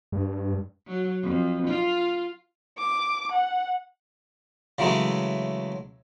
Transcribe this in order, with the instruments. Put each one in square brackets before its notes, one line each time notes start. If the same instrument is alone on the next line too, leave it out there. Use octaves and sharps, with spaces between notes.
[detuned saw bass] G2
[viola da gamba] F#3
F2
F4
[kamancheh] D6
F#5
[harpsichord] C#3 E3 F#3 G#3 A3